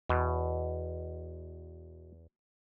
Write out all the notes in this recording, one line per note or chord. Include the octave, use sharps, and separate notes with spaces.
E2 B2